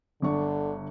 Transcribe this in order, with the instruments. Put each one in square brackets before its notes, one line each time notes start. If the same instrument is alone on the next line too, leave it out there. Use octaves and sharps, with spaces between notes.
[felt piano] G1 D4 C#6 [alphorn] D3